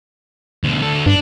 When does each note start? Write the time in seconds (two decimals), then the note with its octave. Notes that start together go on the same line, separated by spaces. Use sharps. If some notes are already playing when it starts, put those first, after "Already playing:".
0.64 D2 B2
0.82 D2 A4
1.06 G2 D4